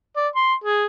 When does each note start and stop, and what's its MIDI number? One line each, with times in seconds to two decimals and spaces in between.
0.16 0.28 74
0.35 0.54 84
0.64 0.85 68